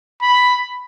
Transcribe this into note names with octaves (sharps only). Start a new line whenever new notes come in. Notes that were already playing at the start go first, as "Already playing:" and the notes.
B5